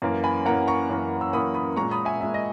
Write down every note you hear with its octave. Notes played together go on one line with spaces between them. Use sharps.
F#2 E3 A#3
G#5 B5
F#2 E3 A#3 F#5 A#5
A#5 C#6
F#2 E3 A#3
E6
F#2 E3 A#3 B5 D#6
B5 D#6
A#2 G#3 A#5 C#6
B5 D#6
E5 G#5
A#2 G#3 E5
D#5